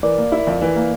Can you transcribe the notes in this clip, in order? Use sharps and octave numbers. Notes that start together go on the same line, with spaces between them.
E3 A#4 D5
A#3
E4
F2
E3
A#3